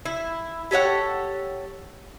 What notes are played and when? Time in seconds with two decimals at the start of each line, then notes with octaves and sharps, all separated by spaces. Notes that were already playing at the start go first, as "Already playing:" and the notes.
0.06 E4
0.71 G4 A4 C#5 F#5